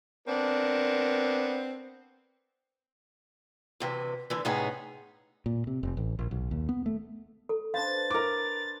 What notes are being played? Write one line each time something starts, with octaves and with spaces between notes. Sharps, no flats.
B3 C4 D4 A#4
D2 C3 E3
D2 D3 E3
A2 C3 B3 C#4 D#4 G#4
A#2
C3
F1
A1
A#1
B1
D#2
B3
A3
A4
D4 B4 C5 F5 A6
A#4 D6